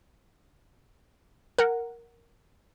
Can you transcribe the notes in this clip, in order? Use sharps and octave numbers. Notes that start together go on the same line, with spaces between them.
A#4 F#5